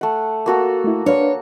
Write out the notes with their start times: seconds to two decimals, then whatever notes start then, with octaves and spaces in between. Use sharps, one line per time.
0.01 A3 F#5
0.46 A#3 F#4 A4
0.84 A3 E4
1.06 D4 B4 C#5 F5